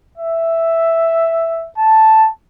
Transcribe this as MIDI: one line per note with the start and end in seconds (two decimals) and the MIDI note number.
0.17 1.67 76
1.76 2.28 81